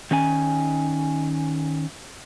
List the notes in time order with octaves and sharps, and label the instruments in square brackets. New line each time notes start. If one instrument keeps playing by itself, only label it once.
[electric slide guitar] D#3 C#4 G#5